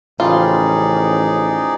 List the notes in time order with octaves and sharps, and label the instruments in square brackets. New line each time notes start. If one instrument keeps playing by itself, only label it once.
[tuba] A1 [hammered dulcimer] C#3 F3 G3 [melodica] D#4 G#4 D5 [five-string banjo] F4
[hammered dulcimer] C#4 A#4